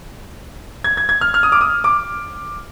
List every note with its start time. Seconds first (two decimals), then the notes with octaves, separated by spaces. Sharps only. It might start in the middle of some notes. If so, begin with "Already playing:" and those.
0.84 G#6
0.97 G#6
1.09 G#6
1.21 F6
1.34 F6
1.43 D#6
1.52 D6
1.61 D#6
1.84 D6